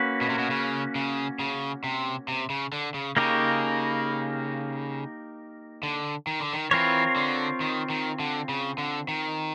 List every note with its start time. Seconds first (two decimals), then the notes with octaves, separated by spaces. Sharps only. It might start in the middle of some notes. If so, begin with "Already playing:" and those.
Already playing: A#3 C#4 F#4 B4
0.21 B2
0.30 C3
0.38 B2
0.51 C#3
0.95 C#3
1.40 C#3
1.84 C3
2.28 C3
2.50 C#3
2.72 D3
2.94 C#3
3.17 C#3 A#3 D#4 G4 A#4
5.83 D3
6.27 D#3
6.40 D3
6.53 D#3
6.71 E3 C4 F4 A#4 C#5
7.16 D3
7.60 D#3
7.90 D#3
8.20 D3
8.49 C#3
8.78 D3
9.08 D#3